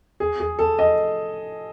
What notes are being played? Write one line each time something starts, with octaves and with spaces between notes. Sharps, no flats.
G#4
G#4
A4
D#5